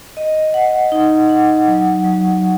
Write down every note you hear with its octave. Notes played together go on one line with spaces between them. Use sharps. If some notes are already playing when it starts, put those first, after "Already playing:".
D#5
F#5
D#4
F#5
F#3
F#3